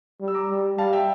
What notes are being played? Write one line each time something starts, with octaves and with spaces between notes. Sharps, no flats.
G3
E6
A#5 D6
G3
G3 F5 A5
E5 G5